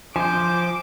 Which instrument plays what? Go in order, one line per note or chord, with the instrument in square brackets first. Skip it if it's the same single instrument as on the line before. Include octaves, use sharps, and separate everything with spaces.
[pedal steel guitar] F3 C5 [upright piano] G#5 [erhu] D6